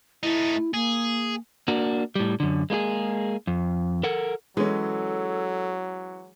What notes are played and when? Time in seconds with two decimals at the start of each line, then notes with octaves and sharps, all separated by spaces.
0.23 A3 D#4 E4
0.74 A#3 G#4
1.68 A#3 D4 F#4
2.16 A2 G3
2.40 F#2 D3
2.70 G#3 A#3 D#4 G#4
3.47 F2
4.03 A4 A#4 F#5
4.57 E3 F#3 G#3 C#4 A4